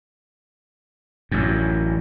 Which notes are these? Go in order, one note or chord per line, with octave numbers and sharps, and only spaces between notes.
A1 F#2